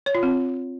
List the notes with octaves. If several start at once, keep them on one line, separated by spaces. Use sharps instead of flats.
C#5
F4
C4